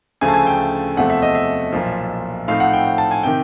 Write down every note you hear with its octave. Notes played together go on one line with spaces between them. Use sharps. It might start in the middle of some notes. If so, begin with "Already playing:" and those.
D2 C#3 F3 A3 G#5
A5
G#5
G5
E2 C3 F3 A3 F#5
E5
D#5
E5
B1 A#2 F3
A2 F3 A3 C4 D#4 F5
F#5
G5
A5
G#5
C3 D#3 G5